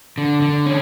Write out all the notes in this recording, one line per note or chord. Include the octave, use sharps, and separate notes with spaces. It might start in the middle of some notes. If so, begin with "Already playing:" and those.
D3
D3
C#4